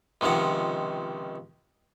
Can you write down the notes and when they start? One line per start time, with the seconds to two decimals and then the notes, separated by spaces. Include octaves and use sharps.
0.21 C#2 C3 D#3 F3 F#5